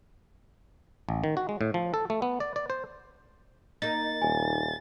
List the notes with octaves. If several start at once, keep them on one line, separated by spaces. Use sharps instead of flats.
A1
D#3
F#4
G#3
A2
F3
A4
A3
B3
D5
D5
C5
A#3 D#4 A6
D#1 G#5